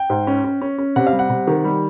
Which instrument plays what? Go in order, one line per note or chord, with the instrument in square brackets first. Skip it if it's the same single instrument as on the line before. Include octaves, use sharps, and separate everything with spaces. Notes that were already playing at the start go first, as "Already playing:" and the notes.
Already playing: [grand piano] G5
[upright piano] G#2
C#4
C#4
C#4
C#4
[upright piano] C3 [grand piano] F#5
[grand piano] F5
[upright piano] G3
[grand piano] F#5
[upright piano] C3
D#3
G3